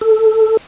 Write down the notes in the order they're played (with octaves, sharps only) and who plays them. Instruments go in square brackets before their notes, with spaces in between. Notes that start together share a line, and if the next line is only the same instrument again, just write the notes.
[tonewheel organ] A4